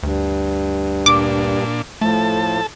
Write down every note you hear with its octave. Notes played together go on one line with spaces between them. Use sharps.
D2 G2
A#2 D4 D6
A2 F3 A3 A4 A5